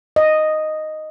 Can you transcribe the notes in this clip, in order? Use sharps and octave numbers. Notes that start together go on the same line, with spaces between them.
D#5